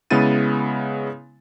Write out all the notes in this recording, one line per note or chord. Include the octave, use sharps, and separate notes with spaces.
C#3 G#3 B3 E4 A6 D#7